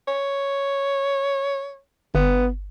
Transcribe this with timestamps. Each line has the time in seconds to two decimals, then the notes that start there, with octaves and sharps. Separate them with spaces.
0.08 C#5
2.15 G1 B3